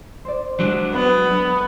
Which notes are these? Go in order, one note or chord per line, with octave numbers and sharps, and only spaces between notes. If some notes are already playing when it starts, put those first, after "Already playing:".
C5 D5
F#3 G#3 D4
B3
A4